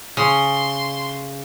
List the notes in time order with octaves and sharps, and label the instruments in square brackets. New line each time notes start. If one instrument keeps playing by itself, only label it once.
[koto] C#3 [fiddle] C6